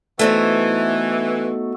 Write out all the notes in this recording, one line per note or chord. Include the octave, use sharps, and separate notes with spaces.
E3 A3 B3 D#4 F#4 A4 C5